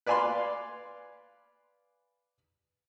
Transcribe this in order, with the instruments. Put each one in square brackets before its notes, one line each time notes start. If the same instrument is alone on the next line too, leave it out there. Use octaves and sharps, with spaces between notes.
[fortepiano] B4 D5 F5 G#5 B5 C6